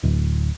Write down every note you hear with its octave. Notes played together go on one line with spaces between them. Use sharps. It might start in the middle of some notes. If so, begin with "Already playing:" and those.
D1